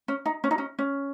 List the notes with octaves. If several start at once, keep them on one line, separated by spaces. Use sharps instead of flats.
C#4
D#4
C#4
D#4
C#4
C#4